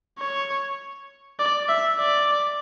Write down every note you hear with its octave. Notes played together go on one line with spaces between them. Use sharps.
C#5
D5
E5
D5